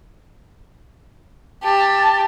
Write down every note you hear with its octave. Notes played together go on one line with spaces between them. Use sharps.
G4 A5